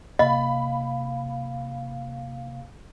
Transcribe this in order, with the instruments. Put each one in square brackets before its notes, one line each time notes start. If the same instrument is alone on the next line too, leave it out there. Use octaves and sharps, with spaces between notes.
[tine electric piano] C3 A#3 [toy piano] D#5 [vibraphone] F5 [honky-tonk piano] B5